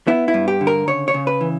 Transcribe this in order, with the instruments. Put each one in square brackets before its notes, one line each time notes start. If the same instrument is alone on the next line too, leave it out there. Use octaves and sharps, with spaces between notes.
[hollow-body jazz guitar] B3 E4
E4
G2
G4
D3
A#4
C#3 C#5
C#5
C#3
B4
E3